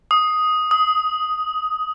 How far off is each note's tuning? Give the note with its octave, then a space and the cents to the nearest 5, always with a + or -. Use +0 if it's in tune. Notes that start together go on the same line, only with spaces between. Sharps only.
D#6 +5
D#6 +20